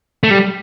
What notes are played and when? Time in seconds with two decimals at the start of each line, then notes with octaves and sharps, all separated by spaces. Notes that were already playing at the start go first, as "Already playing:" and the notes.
0.23 A3
0.31 G3